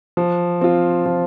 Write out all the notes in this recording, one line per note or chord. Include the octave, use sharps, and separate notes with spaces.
F3
C4 F4
F3